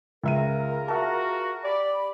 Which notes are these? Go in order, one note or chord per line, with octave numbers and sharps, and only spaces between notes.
C#2 F4 G#4 A#4 E5 D#7
F#4 E5 A5
G4 D5 B5